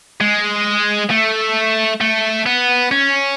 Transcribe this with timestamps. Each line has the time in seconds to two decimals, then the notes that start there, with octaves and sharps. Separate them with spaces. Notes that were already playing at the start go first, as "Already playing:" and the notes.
0.21 G#3
1.10 A3
2.01 A3
2.46 B3
2.91 C#4